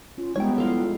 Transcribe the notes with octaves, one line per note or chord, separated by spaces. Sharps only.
C#4 F4
G3 G#3 B3 D#4 C#5 G5
F3 G#3 E4 F4 A4 F5